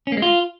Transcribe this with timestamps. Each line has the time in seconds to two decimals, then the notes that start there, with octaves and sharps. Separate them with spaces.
0.07 C#4
0.12 A#3
0.17 G#3
0.22 F4